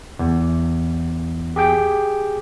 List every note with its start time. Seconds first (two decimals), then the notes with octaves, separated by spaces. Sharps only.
0.19 E2
1.56 G4 G#4 G5